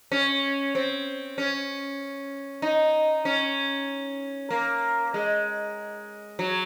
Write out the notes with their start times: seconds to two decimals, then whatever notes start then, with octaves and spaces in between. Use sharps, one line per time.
0.12 C#4
0.75 C4
1.38 C#4
2.62 D#4
3.25 C#4
4.50 A#3
5.14 G#3
6.39 F#3